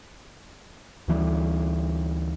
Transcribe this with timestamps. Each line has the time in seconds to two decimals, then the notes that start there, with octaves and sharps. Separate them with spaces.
1.08 D2 E3 F3 G3